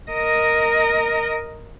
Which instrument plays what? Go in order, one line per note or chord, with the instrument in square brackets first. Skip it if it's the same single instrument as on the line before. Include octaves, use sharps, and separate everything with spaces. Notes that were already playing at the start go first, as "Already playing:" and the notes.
[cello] A#4 D#5